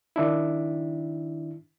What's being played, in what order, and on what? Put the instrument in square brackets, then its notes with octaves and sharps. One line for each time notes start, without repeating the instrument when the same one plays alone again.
[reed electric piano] D#3 D4 E4